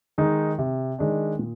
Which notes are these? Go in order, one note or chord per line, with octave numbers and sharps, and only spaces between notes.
D#3 G#3 D#4
C3
D#3 G#3 D4
A#2